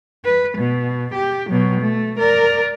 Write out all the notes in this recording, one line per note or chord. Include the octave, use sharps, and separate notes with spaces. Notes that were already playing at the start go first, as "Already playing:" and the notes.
B4
B2
G4
B2 F#3
A3
A#4 D5